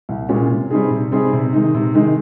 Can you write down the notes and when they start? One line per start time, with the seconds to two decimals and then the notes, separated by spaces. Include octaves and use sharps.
0.09 C2
0.29 A#2 G#3 C#4
0.51 C3
0.71 G3 C4 D#4 G#4
0.91 C3
1.12 G3 C4 D#4 G#4
1.33 C3
1.53 D#3 G#3 D#4
1.74 C3
1.95 D#3 G#3 D#4